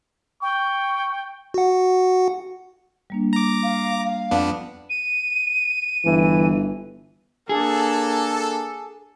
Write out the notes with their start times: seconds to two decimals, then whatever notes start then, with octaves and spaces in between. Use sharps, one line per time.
0.42 G5 C#6
1.54 F#4 F#5
3.10 G3 A#3 D4
3.33 A#5 D6
3.63 F5
4.05 F5
4.31 F2 B3 D4
4.90 D#7
6.05 G1 E3
7.49 A#3 D4 G#4 A4